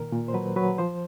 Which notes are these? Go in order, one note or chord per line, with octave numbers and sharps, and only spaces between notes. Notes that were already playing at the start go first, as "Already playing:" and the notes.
Already playing: A#2 D#3 A#4
A#2
C5
F#3 B4
F#3 B4
F3 C5